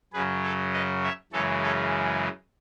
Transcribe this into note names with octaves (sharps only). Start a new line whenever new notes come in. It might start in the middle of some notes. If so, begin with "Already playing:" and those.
F#2 C#3 F#3 G#4 B4
A4 C#5
B4 D#5
C#5 E5
F#2 C#3 E3 G#3 A4 C#5
A4 C#5